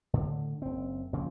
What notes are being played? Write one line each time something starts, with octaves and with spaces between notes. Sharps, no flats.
A2 D3
F#1 C4
C#3 F3 A#3